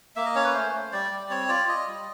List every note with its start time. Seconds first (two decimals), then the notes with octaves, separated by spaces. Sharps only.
0.16 A#3 E5
0.26 D#5
0.35 C#4 C#5
0.44 B4
0.54 A3 C5
0.73 A3
0.92 G3 D5
1.11 G3
1.30 C4 C#5
1.49 F4 D5
1.68 F4 D#5
1.87 G3